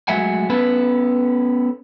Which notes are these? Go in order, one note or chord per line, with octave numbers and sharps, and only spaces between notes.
F#3 G#3 A3 E5 F#5 G#5
B3 C#4 A4 B4